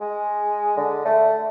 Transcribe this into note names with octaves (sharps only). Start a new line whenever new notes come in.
G#3
D3
A3